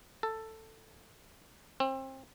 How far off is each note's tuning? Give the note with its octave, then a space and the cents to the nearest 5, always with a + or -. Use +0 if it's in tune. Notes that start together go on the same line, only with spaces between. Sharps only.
A4 +10
C4 +30